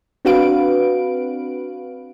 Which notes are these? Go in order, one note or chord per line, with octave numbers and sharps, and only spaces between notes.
C4 D4 F#4 B4 F5 D7